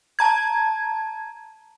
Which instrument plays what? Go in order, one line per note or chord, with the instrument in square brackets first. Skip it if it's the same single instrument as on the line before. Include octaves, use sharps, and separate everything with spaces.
[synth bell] A5 A#5 G#6